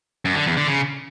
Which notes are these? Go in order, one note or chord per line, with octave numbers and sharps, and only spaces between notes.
F#2
D3
E2
D3
C#3